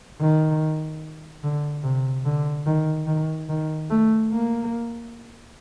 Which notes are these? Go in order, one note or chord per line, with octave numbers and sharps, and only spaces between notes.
D#3
D3
C3
D3
D#3
D#3
D#3
A3
A#3